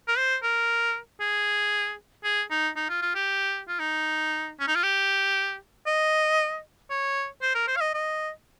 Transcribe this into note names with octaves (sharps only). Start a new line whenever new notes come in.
A#4
C5
A#4
G#4
G#4
D#4
D#4
F4
F4
G4
F4
D#4
C#4
D#4
F4
G4
D#5
C#5
C5
A#4
C5
F5
D#5
D#5